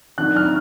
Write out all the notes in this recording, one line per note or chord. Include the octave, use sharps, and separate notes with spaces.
D#3 F#3 D4 F#6
F6